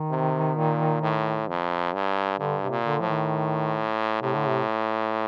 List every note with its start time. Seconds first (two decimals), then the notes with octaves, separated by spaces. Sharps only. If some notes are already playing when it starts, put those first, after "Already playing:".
Already playing: D#3
0.11 C3
0.57 A#2
1.01 A2
1.48 F2
1.93 G2
2.39 G2 D3
2.62 C3
2.70 A#2
2.85 D3
3.00 A2 F3
3.08 D#3
4.22 A2 C3
4.35 D3
4.48 C3